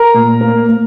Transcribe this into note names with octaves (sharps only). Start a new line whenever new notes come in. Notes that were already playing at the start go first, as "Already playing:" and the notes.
Already playing: A#4 A#5
A#2
A#3
A#3